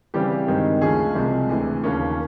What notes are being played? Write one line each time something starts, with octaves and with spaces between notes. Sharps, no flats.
C#3 E3 G3 C4 G4
G2 D#3 G#3 C4 D#4
D2 C#3 F3 G#3 C#4 G#4
C2 C3 F3 G#3 C4
D2 C3 E3
D#2 C#3 F3 A#3 C#4